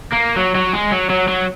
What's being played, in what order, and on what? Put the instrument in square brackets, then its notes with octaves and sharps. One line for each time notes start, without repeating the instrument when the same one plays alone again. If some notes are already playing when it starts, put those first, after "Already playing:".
[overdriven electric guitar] A#3
F#3
F#3
G#3
F#3
F#3
F#3